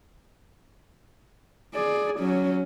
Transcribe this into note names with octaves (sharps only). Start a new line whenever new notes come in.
G#4 D5
F#3 C#4